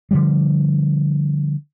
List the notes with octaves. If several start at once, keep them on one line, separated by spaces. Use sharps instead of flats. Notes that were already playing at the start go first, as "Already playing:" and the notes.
D3 F3 G3